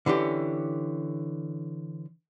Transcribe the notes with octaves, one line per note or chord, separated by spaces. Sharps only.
D3 E3 C#4 G4